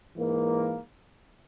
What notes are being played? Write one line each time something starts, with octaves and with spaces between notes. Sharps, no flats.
G#2 E3 A#3